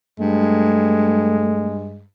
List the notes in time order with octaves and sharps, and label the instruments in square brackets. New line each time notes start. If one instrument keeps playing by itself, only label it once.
[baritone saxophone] G2 [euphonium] G#3 [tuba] A3